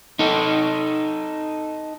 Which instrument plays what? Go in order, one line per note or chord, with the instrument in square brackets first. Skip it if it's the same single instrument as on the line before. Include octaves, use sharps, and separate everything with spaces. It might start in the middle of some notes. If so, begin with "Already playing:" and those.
[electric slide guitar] D#4 A4